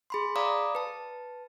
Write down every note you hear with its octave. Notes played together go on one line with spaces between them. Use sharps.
G#4 B5 C6
D5 F5 A#5 B5 D6 D#6
B4 A5